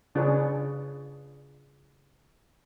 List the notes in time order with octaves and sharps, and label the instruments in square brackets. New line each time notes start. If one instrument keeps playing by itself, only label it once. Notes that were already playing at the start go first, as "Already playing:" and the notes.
[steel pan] C#3 D4 F4 G#4 B4 C#5